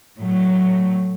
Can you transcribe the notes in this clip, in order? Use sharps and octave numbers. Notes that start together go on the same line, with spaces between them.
A2 F#3 A3